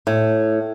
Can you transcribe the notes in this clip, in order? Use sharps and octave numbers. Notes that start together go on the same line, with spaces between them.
A2